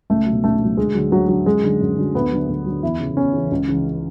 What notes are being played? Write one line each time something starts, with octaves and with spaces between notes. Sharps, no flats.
C#2 A3
F#3
B2
C#2 A3
B2 F#3
D2 G#3
D3 F#3
D2 F#3
D3 F#3
F#2 G#3
D3 F#3
F#2
D3 F#3
D2 B3
D3 F#3
D2
D3 F#3
E2 E4
C#3 E3
E2 C#4
C#3 E3
C#2
C#3 E3